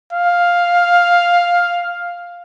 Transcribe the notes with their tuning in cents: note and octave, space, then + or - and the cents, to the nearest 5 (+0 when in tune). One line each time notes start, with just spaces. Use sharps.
F5 +5